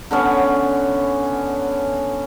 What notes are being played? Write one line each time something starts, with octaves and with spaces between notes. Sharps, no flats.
D3 B3 C#4